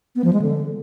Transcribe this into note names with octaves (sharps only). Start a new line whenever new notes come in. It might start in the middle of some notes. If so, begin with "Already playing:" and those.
B3
F3
G#3
D3